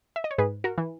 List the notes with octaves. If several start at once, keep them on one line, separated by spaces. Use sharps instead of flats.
E5
D#5
C#5
G#2 G#4 B4
F#4 A#4
E3